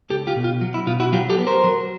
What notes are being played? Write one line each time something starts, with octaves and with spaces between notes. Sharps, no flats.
C#2 G4 A4
F4 G4
B2
F4
F#3
E4
B2 F4
E4 F#4
F#3 F4 G4
G4 A4
B3
A#4 C5
F#3